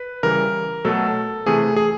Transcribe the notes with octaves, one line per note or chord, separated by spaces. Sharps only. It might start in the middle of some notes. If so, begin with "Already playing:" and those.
Already playing: B4
C#3 E3 G3 A#4
B2 F#3 A3 A4
C3 E3 A3 G#4
G#4